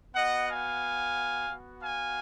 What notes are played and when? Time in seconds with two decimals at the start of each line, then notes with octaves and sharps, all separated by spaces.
0.15 B3 F#4 D#5 F#5
0.48 F5 G#5
1.49 B3 F#4
1.82 F5 G#5